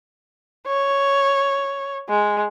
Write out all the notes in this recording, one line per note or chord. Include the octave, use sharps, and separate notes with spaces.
C#5
G#3